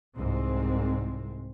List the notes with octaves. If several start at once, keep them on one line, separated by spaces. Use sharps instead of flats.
C2 G#2 C4